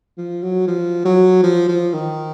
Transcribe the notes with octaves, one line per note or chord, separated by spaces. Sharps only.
F3
F#3
F3
F#3
F3
F3
D#3